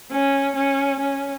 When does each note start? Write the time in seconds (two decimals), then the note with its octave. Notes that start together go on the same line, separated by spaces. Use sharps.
0.12 C#4
0.56 C#4
1.00 C#4